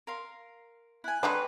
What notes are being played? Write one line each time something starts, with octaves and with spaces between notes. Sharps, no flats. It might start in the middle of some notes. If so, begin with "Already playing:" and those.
A#4 F5 C6
E4 G#5 F#6
G#3 C4 D4 B4 G5 A#5 C#6